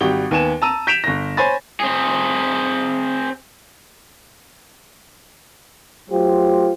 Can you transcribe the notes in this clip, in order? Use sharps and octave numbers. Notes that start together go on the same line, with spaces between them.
G#1 G3 F#4 G5 G7
D#2 B3 G#5 E7
A5 A#5 E6 D#7
G6 B6 D7 E7 F7
G1 A#6
C5 C#5 G#5 B5 A6
C4 G#4
F#3 A3 F4 G4 C5